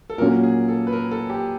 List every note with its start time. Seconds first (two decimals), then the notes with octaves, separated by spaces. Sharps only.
0.10 A4
0.18 A#2 F#3 A#3 C#4 F#4 A#4
0.43 G#4
0.68 A4
0.87 B4
0.92 A#4
1.11 A4
1.30 G4